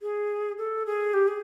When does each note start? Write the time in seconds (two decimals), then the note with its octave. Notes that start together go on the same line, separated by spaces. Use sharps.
0.02 G#4
0.58 A4
0.86 G#4
1.13 G4
1.28 G#4